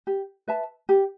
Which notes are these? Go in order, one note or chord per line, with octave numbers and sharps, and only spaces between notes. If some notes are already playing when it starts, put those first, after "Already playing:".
G4
B4 E5 A5
G4